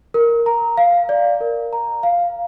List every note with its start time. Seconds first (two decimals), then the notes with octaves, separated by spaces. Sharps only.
0.14 A#4
0.46 A#5
0.77 F5
1.09 D5
1.41 A#4
1.73 A#5
2.03 F5